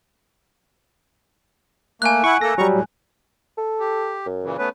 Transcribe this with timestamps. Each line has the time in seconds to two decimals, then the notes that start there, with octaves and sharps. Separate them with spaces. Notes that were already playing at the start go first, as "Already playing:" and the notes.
2.02 A3 A#3 G#5 F#6
2.24 E4 F#5 C#6
2.41 A3 A#3 A4 A#6
2.58 F#3 G3 A#5 C#6
2.72 A2
3.58 A4
3.80 G4
4.26 F#2
4.43 A#2 C#3 E3
4.58 A3 B3 C#4 B4